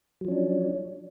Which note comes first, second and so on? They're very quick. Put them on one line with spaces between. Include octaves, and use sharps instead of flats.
F#3 F3 C#4 D4